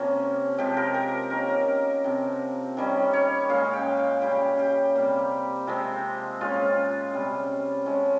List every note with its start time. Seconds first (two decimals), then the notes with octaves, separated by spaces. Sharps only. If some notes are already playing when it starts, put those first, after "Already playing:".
Already playing: C3 F3 A#3 C#4
0.57 C3 F3 G#3 G4
0.77 A#4
0.94 A#4
1.30 D#3 A#3 C#4 A#4
2.04 C3 F3 C4
2.77 D#3 G3 C#4
3.13 C#5
3.49 A#2 G#3 C#4 F5
3.73 G5
3.98 F5
4.22 C#3 G3 C#4 G4
4.59 G4
4.95 C3 G3 A#3
5.67 C3 F3 G#3 C4
6.41 A#2 G#3 C#4 F4
7.14 C3 G3 C#4
7.86 F3 G#3 C#4